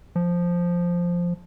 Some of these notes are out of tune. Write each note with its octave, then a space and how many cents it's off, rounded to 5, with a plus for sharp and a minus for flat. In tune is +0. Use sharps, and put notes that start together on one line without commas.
F3 +0